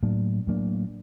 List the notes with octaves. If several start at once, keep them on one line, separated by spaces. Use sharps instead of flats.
A2 F#3 A#3 D4
A2 F#3 A#3 D4